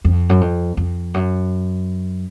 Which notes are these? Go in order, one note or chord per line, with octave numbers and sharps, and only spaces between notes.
F2
F#2
F2
F2
F#2